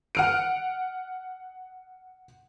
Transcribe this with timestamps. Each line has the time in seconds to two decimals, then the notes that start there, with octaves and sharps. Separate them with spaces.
0.15 F#5 F6 D7